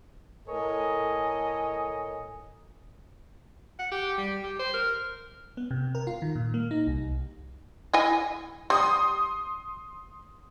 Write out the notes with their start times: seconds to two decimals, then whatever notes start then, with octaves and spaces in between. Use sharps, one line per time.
0.48 A2 A4 A#4 C#5 D#5 G#5
3.79 F#5
3.91 G4
4.18 G3
4.43 G4
4.59 C5
4.73 A#4
5.57 B3
5.71 C3
5.95 A#4
6.07 F4
6.22 D#3
6.35 A#2
6.54 A#3
6.71 D#4
6.87 C2
7.93 E4 D#5 G#5
8.70 G3 C6 D#6